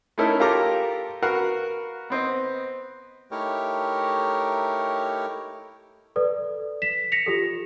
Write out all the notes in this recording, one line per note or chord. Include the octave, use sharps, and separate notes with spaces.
A3 C#4 D#4 E4 A4 A#4
F4 G4 A4 A#4 A#5 D6
F#4 A#4 B4 F5 F#5
B3 C4 D#5
A3 D#4 E4 G4 A#4 C#5
A4 B4 D5
B6 E7
A#6 B6 C#7 F7
F4 G4 A4